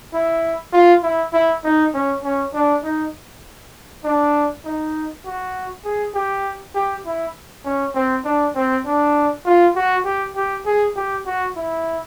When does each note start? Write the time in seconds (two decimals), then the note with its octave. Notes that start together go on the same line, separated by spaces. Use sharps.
0.13 E4
0.73 F4
1.03 E4
1.33 E4
1.64 D#4
1.94 C#4
2.23 C#4
2.53 D4
2.83 D#4
4.04 D4
4.64 D#4
5.25 F#4
5.84 G#4
6.14 G4
6.75 G4
7.05 E4
7.65 C#4
7.95 C4
8.25 D4
8.55 C4
8.85 D4
9.45 F4
9.76 F#4
10.05 G4
10.35 G4
10.66 G#4
10.96 G4
11.26 F#4
11.56 E4